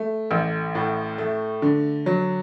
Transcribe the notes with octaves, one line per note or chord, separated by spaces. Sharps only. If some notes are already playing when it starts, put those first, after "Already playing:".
Already playing: A3
A1
A2
A3
D3
F#3